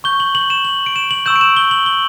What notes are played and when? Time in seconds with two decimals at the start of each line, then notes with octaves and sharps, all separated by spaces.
0.04 C#6 G6 G7
0.20 F#7
0.35 F#7
0.50 E7
0.65 F#7
0.86 D7
0.96 E7
1.11 F#7
1.26 C#6 E6 G6 E7
1.36 D7
1.41 E7
1.57 G7
1.71 F#7
1.86 G7